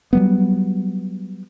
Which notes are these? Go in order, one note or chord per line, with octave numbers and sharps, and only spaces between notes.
F#3 G3 B3